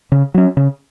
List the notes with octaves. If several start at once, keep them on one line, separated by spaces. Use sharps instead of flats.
C#3
F#3 C#4
C#3